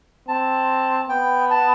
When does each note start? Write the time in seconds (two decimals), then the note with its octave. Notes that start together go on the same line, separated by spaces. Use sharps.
0.28 C4 A5
1.09 B3 G5
1.50 A5